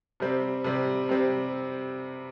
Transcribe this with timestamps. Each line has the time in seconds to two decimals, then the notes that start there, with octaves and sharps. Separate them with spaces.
0.20 C3 G3 C4
0.64 C3 G3 C4
1.09 C3 G3 C4